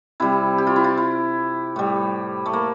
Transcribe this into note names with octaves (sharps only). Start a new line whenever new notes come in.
C3 G3 E4
G4
F4
E4
F4
E4
A2 G3
A3
A#3